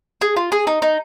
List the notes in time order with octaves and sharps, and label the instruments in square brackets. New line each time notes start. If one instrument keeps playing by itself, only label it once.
[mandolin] G#4
F4
G#4
D#4
D#4